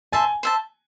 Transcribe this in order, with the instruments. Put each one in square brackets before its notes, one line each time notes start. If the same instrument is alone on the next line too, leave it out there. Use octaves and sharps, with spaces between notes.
[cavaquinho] C5 E5 A5 [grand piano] G#5
[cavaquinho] C5 E5 A5